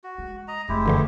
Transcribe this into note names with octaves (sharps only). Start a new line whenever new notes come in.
F#4
G#3
D#5 A#5
F1 G#3 E4 G4
F#2 D3 E3